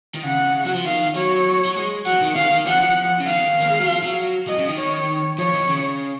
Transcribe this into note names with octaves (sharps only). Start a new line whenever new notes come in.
D#3
C#3 F#5
F#3
F3
D#3 F5
F#3 C#5
F#3
G#3
F#3 F#5
D#3
D#3 F5
D#3
F3 F#5
F3
C#3
D#3 F5
A#3
G#3
F#3
F3
F#3
F#3 D#5
C#3
D#3
C#5
F3 C#5
D#3
C#3